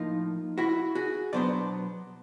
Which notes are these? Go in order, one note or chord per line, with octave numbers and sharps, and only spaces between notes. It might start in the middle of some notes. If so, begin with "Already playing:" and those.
Already playing: A2 F3 A#3 D#4 F4
E4 F#4
F#4 G#4
B2 F#3 B3 D4 C5 D5